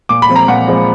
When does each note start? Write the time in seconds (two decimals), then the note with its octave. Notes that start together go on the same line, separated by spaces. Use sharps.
0.09 A#2 D6
0.22 B5
0.29 F3 G#3 C4
0.36 A#5
0.48 A#2 F#5
0.67 F3 G#3 C4